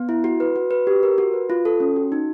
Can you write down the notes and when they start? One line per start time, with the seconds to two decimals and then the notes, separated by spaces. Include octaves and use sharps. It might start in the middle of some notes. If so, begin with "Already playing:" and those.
Already playing: B3
0.09 E4
0.24 F#4
0.40 B4
0.56 F#4
0.71 B4
0.87 G4
1.03 A#4
1.18 F#4
1.33 B4
1.50 F4
1.65 A4
1.80 C#4
1.96 F#4
2.12 D#4